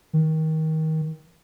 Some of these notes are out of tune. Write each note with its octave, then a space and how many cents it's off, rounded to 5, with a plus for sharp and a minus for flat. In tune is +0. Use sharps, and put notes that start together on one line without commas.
D#3 +25